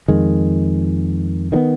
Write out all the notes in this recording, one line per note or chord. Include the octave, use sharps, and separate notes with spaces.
F2 D#3 G#3
D#3 F#3 B3